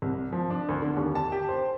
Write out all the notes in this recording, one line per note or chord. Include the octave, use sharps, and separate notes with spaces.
C2
F3
D4
D2
D3
D#2
A5
G4
C5